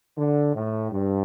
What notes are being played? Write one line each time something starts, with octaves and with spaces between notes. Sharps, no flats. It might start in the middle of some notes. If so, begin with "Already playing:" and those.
D3
A2
G2